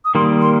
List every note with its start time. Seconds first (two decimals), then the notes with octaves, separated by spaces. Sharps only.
0.05 D#6
0.15 D#3 G3 A#3 C6
0.41 C6